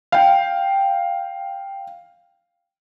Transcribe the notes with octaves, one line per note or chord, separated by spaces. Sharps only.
F5 G5